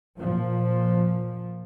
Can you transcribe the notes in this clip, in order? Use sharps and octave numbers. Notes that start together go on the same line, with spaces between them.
A#2 F3